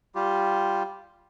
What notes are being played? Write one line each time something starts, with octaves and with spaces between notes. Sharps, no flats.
G3 F4 G4